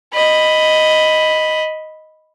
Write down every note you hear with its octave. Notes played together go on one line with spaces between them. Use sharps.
D#5 B5